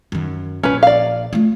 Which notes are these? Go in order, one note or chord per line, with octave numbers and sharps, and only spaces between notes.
F#2 D#3
A#1 C#4 B4
D5 F5
A3 F4